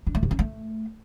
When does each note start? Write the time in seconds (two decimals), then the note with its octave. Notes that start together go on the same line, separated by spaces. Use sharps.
0.07 D4
0.15 A3
0.23 C3
0.31 C#4
0.39 A3